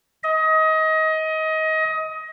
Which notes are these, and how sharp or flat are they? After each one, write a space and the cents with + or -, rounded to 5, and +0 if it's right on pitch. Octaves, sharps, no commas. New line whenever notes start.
D#5 +25